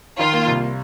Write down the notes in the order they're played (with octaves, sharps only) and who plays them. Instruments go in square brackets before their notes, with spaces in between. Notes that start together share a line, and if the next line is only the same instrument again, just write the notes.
[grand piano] D#3 [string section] F4
[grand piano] A#3
C2